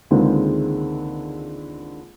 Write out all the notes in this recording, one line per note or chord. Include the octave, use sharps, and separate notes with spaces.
C#2 D3 D#3 G#3 A#3 C4